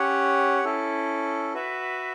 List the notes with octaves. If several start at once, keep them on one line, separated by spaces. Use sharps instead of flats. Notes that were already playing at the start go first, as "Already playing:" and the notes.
Already playing: C#4 G4 C#5 F#5
C#4 E4 A4
F#4 B4 E5